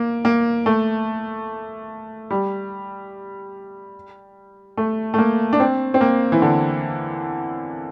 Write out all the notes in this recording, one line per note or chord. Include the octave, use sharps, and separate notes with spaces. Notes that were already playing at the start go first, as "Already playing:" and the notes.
Already playing: A#3
A#3
A3
G3
A3
A3
A#3
D4
C4
C4
A#3
E3
D3